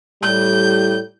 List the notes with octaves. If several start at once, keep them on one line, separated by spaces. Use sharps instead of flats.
A2 G3 G6